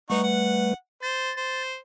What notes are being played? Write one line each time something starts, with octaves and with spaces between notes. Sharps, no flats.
G3 A3 D#4 B4 F#5 C#6
F#5
C5 A6
C5